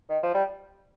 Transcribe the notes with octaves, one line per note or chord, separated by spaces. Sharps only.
D#3
F3
G3